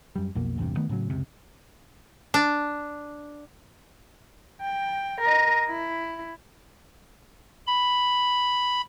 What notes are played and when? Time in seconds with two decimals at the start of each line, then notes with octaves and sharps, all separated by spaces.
0.16 F#2 G3
0.35 B1 F2 B2 A#3
0.58 A1 E2 G2 C3
0.77 D#3 A3 B3
0.89 A2 C#3 F#3
1.10 F#1 C#2 C3
2.34 D4
4.62 G5
5.21 A#4 D#5
5.69 E4
7.67 B5